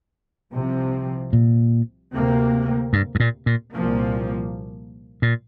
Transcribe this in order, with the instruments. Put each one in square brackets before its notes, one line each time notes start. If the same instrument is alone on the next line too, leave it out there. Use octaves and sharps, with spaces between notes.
[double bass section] C2 C3 F3 C4
[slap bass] A#2
[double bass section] D2 C3 A#3
[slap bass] G2
G2
A#2
A#2
[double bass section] C2 A#2 F3 A#3
[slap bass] A#2